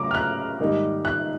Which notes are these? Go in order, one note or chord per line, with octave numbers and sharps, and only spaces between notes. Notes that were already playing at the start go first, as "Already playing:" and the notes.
Already playing: C#3 F#3 A3 C#4 A#5 D6
F6
F#6
G#2 D#3 G3 A#3 D#4
F#6